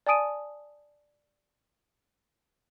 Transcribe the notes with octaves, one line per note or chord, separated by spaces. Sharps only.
D5 G#5 A5 D#6 D7 D#7